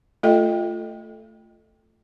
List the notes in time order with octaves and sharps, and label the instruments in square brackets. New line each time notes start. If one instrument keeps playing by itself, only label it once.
[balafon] A3 F4 A4 D#5 G5